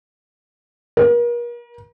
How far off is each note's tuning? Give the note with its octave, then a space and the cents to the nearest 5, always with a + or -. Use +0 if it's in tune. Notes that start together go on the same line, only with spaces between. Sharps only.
A#4 +40